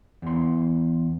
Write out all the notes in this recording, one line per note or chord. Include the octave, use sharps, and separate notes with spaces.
E2 C6